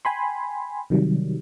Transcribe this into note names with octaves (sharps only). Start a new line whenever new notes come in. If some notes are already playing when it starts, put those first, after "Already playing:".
G5 G#5 B5 C6
C3 D#3 F#3 G3